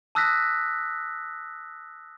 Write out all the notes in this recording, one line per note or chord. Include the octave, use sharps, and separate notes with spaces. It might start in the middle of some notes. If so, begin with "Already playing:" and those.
A5 D#6 E6 F#6 A#6 B6